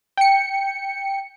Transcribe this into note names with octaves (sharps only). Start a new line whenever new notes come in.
G5 C#7